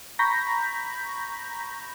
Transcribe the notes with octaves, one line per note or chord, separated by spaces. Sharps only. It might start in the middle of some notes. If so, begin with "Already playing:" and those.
A#5 B5 C#6 G6 A#6 B6